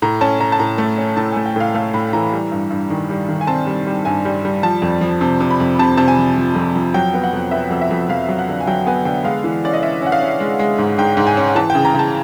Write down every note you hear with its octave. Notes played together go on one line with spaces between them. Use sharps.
A2 A#5
C#4 A5
C#4 A#5
A5
A2 A#5
A3
C#4
A2 A5
A3 G#5
G5
A2 F5
A3 F5
A2 B5
E3 A#5
G3
G2
G2
D#3
G3
D#3
G#5
C4 A5
G3
G3
G2 G#5
G3
G3
F3 A5
F2
F3
C3
C3
B5
F2
C3 A5
C3 A5
G#5
F3
F3
F2
F2
F#3 G5
B3
F#5
F2
B3 E5
F2
E5
F2
F2 F5
F#3
F#5
D3
G#5
F#3 G5
B3 G#5
D3 G5
G#3 F5
E3
C#4 D5
D#5
C#4 E5
C#4 F#5
F5
C#4
G#3
G#3
G#2
G#2 G5
G#2
G#5
C#4
E3 A5
G5
C#3
A#5
C#3 A5